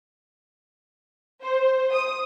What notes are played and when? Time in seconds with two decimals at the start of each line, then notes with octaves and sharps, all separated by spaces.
1.42 C5
1.94 D#6